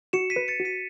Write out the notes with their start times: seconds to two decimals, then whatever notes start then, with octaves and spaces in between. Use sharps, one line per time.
0.13 F#4 C#7 E7
0.30 B6 D#7
0.36 B4
0.48 A6 C#7
0.60 F#4
0.65 B6 D#7